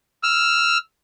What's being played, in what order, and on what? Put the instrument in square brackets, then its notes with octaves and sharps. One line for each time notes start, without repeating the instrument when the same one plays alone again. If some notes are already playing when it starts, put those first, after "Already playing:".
[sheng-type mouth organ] E6 F6